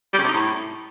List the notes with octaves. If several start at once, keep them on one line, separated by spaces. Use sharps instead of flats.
G3
C#3
C3
D#4
A2